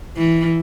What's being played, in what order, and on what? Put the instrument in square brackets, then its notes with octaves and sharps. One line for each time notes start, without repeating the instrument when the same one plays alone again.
[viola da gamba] E3